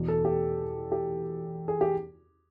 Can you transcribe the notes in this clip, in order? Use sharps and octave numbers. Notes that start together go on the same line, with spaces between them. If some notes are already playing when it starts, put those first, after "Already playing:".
Already playing: E2 B2
A4
G4
G4
G#4
G4